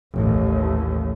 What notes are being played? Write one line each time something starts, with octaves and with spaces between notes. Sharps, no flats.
A1 D#2